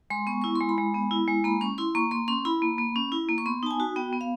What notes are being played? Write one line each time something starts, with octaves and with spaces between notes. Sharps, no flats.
G#3 C6
B3 C#6
E4 C#6
C6
G#3
B5
G#3
B3
E4
G#3
A#3 B5
C#4 C#6
E4 C6
A#3 C#6
A#3 C6
C#4 C6
E4 B5
A#3
A#3
C#4
E4
A#3
C#6
B3 C6
D#4 A5
G#5
F#4
B3 G5
B3
F5